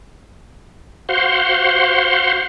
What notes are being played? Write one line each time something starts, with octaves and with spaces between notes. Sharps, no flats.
F#4 C5 F5 F#5 C6